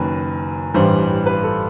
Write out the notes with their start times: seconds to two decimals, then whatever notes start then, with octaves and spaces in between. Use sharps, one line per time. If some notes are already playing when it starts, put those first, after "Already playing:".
Already playing: F#1 F#2 D#3 B4
0.74 A1 G2 E3 G3 C5
1.26 B4
1.43 A4